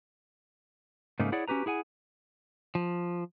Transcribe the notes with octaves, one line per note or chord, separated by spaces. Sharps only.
G#2 C#3 A3 A#3 D#4
E4 G#4 C#5 D5 F#5
C#4 F#4 G4 B4 A#5
E4 G#4 F#5 G#5
F3